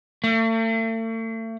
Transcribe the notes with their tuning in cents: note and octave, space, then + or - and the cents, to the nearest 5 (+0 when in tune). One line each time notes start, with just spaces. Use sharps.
A3 +40